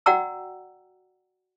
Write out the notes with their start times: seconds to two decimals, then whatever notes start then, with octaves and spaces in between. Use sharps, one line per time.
0.06 F#4 D5 F#5 G5 A#5 E6